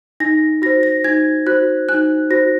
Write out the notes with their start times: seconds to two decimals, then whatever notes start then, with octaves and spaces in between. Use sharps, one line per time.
0.20 D#4 A#6
0.62 F#4 C5 A#6
0.83 A#6
1.04 D#4 G#6
1.47 F#4 C5 F#6
1.89 D#4 F#6
2.30 F#4 C5 A#6